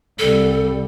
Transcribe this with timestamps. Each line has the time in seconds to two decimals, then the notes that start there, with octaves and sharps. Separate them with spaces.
0.19 C2 G3 A4